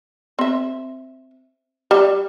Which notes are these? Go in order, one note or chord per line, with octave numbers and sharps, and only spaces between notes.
C4 E5
G3